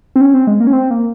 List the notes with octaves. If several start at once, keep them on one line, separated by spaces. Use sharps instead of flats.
C4
C#4
C4
G#3
A#3
C#4
C4
A#3